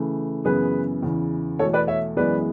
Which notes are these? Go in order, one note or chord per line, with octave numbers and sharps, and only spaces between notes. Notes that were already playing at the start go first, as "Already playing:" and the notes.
Already playing: C#3 E3 A3
F#2 C#3 E3 B3 G#4 B4
E2 C#3 E3
E2 B2 A3 A4 C#5
B4 D5
C#5 E5
F#2 E3 G#3 B3 B4 D5